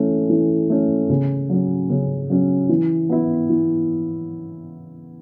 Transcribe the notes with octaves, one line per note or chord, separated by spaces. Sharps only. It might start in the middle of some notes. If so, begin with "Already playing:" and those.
Already playing: E3 A3 C#4
E3
A3 C#4
C#3
F#3 C#4
C#3
F#3 C#4
E3
B3 E4
E3